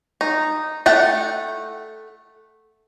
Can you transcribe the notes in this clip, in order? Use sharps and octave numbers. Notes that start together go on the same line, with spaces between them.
D#4
A3 F#5 G5